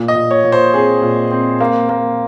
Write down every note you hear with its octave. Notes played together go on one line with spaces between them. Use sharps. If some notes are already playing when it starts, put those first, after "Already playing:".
Already playing: A#2
D#5
A#2
C#5
A#2
C5
C4 G#4
A#2
C4
A#3
A#3